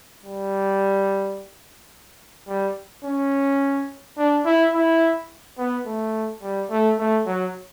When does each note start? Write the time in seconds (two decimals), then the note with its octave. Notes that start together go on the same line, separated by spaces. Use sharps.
0.24 G3
2.48 G3
3.05 C#4
4.18 D4
4.46 E4
4.74 E4
5.58 B3
5.86 A3
6.42 G3
6.70 A3
6.99 A3
7.26 F#3